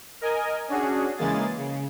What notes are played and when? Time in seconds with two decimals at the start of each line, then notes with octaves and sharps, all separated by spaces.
0.21 A#4 D#5 G#5
0.68 C#4 D4 F#4 G#4
1.18 C#3 E3 G#3 A#3 G#4 A6
1.57 C#3